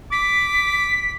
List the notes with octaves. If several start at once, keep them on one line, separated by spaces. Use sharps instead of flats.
D6 B6